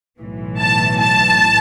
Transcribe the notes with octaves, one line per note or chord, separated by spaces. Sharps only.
B1 A2 E3
A5
A5